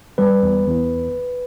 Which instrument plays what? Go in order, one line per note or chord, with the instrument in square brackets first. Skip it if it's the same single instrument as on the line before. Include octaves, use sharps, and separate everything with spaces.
[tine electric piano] G3 B4
E2
E2